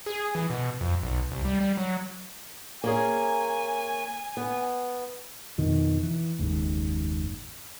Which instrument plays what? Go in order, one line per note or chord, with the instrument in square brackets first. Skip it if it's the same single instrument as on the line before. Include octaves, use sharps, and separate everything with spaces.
[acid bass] G#4
E3
B2
F2
B1
C2
G3
G3
F#3
[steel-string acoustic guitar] A#3 C#4 G#4 [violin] G#5
[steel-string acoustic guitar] B3
[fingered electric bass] F2 B2 D#3
E3
F#1 D#2 G#2